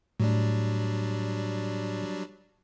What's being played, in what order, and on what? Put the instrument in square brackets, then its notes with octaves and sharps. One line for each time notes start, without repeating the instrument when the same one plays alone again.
[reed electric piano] A2 [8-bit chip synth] F#3 G3 D4